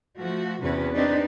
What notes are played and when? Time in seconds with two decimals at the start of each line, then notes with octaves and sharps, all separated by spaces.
0.18 F3 A3 F#4
0.62 E2 C3 C#4 F#4 B4
0.94 C4 D4 D#4 G4 B4 D5